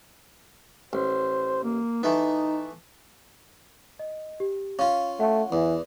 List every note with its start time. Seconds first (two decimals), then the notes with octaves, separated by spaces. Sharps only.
0.93 A1 C5
1.63 A#3
2.03 E3 A3 B3 D#4
3.99 D#5
4.40 G4
4.79 C#4 F4 F5
5.20 A3 F#5
5.52 E2 E3